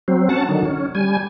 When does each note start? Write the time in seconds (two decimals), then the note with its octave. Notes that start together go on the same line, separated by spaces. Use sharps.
0.08 F#3 C4
0.29 C#4 F#5 A5
0.49 D3 D#3 F#3
0.65 C#4
0.95 G3 G#5